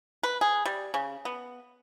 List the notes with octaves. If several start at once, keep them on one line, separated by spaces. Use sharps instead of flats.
B4
G#4
G3
C#3
B3